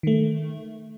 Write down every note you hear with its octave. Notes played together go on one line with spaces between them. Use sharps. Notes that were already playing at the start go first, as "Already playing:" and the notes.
D#3 A3